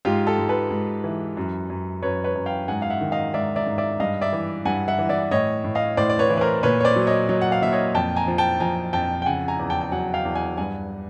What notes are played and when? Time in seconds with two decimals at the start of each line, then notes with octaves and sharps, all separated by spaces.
0.05 G#2 F4 G4
0.27 G4 A4
0.38 G#2
0.49 A4 B4
0.71 G#2
1.04 E3
1.37 F#2
1.70 F#2
2.02 F#2 B4 C#5
2.24 B4 C#5
2.35 F#2
2.46 F5 G5
2.68 G#2 F#5 G#5
2.82 F5
2.90 E5 F#5
3.01 D#3
3.12 D#5 F5
3.34 G#2 D5 E5
3.56 D5 E5
3.67 G#2
3.78 D5 E5
4.00 G2 D#5 F5
4.21 D5 E5
4.33 E3
4.65 G2 F#5 G#5
4.88 E5 F#5
4.99 E3
5.09 D5 E5
5.31 A2 C#5 D#5
5.64 A2
5.75 D#5 F5
5.97 A2 C5 D5
6.10 D5
6.19 B4 C#5
6.30 E3
6.37 B4
6.41 A#4 C5
6.63 A#2 B4 C#5
6.80 C#5
6.85 C5 D5
6.96 F#3
7.07 C#5 D#5
7.29 F#3 C#5 D#5
7.41 F#5
7.52 F5
7.62 A#2 E5
7.72 C#5 D#5
7.94 F2 G5 A5
8.16 G#5 A#5
8.28 F3
8.38 G5 A5
8.60 F3 G#5 A#5
8.93 F2 G5 A5
9.22 G5
9.26 C#3 F#5 G#5
9.48 G#5 A#5
9.59 E2
9.70 G5 A5
9.81 G5
9.91 F#3 F#5 G#5
10.14 F5 G5
10.25 E2
10.35 F#5 G#5
10.57 G2 F#5 G#5